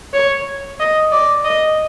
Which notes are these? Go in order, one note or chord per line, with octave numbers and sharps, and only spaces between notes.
C#5
D#5
D5
D#5